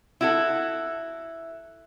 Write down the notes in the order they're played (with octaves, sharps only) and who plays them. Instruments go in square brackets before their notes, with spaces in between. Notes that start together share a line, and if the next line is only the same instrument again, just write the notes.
[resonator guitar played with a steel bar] E4 F#4 A4